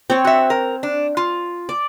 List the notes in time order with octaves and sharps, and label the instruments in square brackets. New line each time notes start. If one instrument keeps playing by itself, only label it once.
[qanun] C4 C#5
[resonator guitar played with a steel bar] F#4 E5
A#4
D4
F4
[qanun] D5